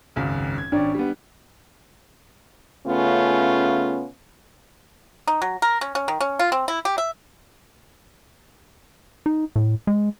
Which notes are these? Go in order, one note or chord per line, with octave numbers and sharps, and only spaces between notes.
G#1 C#2 F#2
G#6
G#1 C#4 D4 D5
G3 B3
C#3 A3 B3 C#4 F4
D#4
F#3
A#4
C#4
C#4
D#3
C#4
F4
C4
E4
G4
E5
D#4
A2
G#3